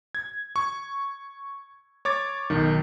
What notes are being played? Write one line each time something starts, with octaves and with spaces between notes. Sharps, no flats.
G#6
C#6
C#5 D6 A6
B1 D#3